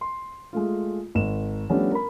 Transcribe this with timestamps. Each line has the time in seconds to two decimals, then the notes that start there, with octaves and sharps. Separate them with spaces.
0.01 C6
0.53 G#3 A3 F4
1.15 G#1 E7
1.70 F3 G3 A3 B3 C#4 D4
1.92 A#4 B5